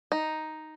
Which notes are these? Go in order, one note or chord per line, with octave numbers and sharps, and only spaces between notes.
D#4